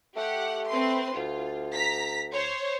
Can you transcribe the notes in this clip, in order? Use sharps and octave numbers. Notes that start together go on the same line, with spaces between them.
A3 G4 F#5
C4 B4 C6
D2 F4
A#5 B6
C5 C#5